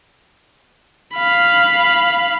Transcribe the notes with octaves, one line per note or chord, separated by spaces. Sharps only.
F5 B5